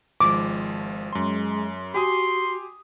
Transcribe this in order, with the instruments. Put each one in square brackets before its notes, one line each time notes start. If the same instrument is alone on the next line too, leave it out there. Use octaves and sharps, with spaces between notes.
[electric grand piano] G#1 F3 G#3 [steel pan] D6
[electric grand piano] F#2 C6 [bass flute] G#3
[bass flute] F#4 [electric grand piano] G4 G#5 D#6 [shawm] C6